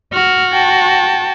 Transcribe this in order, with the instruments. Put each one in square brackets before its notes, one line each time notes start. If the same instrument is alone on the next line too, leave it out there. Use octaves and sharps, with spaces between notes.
[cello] F#4 [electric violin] F6
[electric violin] G5 A5